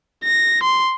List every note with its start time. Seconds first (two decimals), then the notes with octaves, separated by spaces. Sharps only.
0.24 A#6
0.63 C6